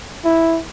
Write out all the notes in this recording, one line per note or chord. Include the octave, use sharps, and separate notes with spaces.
E4